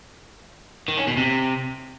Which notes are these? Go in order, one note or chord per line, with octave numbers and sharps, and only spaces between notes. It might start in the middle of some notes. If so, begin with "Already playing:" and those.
D#3
C#4
B2
C3